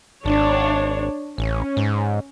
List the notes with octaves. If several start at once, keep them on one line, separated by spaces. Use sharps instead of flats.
G#1 D4 C#5
A1 C#4
G#2